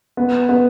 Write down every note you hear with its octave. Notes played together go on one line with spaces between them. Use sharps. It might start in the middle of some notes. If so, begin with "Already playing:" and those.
B3
B3